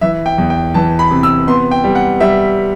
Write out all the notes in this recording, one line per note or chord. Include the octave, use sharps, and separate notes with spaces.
E3 E5
G5
E2
G5
E3 A5
B5
C3
E6
B3 C6
G5
G3
F#5
G3 E5